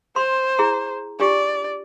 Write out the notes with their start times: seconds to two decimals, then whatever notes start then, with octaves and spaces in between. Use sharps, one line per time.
0.16 C5 C6
0.59 E4 G#4 A#5
1.20 D4 F4 G4 D5